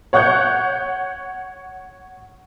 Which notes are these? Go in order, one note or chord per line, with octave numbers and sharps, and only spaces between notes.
C#5 F#5 C#6 F#6 G6